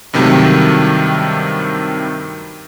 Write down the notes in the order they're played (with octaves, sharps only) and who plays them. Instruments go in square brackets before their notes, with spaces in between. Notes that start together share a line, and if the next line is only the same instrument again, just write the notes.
[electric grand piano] G2 C3 D#3 F#3 G3 A3